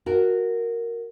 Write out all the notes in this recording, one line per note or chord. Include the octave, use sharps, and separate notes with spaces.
F#4 A#4